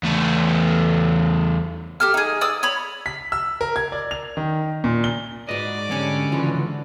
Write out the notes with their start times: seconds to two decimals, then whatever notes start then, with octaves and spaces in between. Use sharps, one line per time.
0.03 E2 A3
2.00 G4 A4 F6
2.14 D#4 G#4
2.41 D5 D#6 E6
2.63 C#5 B5
3.06 B6
3.32 E6
3.61 A#4
3.76 G#6
3.92 D5
4.11 F7
4.37 D#3
4.84 A#2
5.04 G7
5.49 G#2 F#4 B4 D5 D#5
5.91 D3 G3 C#4 C#5
6.32 C#2 E3 F3 F#4